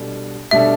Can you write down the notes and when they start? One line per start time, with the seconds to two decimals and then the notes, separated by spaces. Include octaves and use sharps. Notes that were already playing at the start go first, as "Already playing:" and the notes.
Already playing: B2 G3 D4 A4
0.51 B2 G3 D4 A4 E5